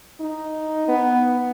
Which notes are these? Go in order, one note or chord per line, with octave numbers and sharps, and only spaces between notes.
D#4
B3